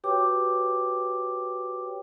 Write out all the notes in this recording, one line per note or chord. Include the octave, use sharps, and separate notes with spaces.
F#4 G4 B4 C#5 G5 D6